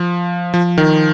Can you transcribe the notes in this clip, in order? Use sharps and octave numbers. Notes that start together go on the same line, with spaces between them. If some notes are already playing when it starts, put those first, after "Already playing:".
Already playing: F3
F3
D#3